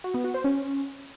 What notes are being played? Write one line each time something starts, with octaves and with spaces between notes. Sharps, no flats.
F#4
B3
F#4
C5
C#4